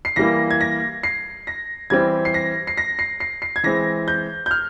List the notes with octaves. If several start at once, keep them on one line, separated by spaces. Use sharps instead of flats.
C7
E3 G3 A#3 A#6
G#6
A#6
C7
A#6
E3 G3 C4 G#6
C7
A#6
C7
A#6
C7
C7
C7
G#6
E3 G#3 C4 A#6
G6
G6
F6